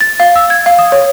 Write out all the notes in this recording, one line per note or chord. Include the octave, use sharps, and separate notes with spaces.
A6
F5
E6
G#6
F5
D#6
C#5